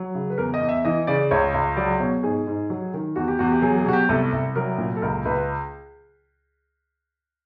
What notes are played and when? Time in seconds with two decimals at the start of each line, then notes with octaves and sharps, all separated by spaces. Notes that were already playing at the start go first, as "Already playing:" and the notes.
Already playing: F#3
0.15 C#3
0.30 B4
0.38 E2 A#4
0.54 D#5
0.61 E2
0.69 E5
0.85 E3 D#5
1.07 C#3 D5
1.31 C#2 C#5
1.54 C#2
1.77 F#3 D5
2.00 B2 C#5
2.23 G#2 G#4
2.47 G#2
2.70 F#3
2.94 D#3
3.16 E2 F#4
3.28 G4
3.39 E2 F#4
3.52 G4
3.62 F#3 G#4
3.78 G#4
3.86 B2 F#4
3.93 G4
4.09 C2 A4
4.33 C2
4.56 F#3 A#4
4.78 A#2
4.96 A4
5.02 C#2 A#4
5.25 C#2 B4